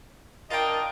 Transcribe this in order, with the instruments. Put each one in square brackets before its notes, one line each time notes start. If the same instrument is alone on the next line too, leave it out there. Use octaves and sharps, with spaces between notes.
[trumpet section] D4 A#4 D#5 [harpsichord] F4 G5